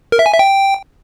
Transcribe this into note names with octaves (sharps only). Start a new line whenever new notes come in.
A#4
E5
G#5
E5
G5